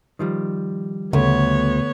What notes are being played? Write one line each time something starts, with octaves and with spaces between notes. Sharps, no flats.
D#3 F3 G3
D2 C#3 B3 C#5